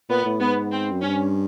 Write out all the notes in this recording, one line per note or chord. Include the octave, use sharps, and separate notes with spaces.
A#2 B3
A2
G#2 B3
C4
F#2
G2 C#4